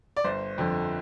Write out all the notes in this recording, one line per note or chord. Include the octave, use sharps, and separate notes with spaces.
D5
G1 C5
F2 D3 F3